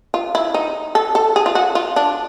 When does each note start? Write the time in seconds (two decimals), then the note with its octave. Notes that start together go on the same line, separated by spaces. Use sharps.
0.14 F4
0.35 E4
0.54 D#4
0.95 A4
1.15 A4
1.36 G#4
1.46 F4
1.55 F#4
1.75 F4
1.96 D4